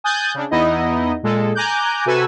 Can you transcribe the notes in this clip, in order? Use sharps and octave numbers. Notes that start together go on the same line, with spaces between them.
G#5 D#6 F#6 G6 A6
C#3 D4
E2 B3 D#4 E4 D#5
A#2 G#3 A4
G#5 A#5 D6 F#6 G6
C3 F#4 A4 B4 G#5 E6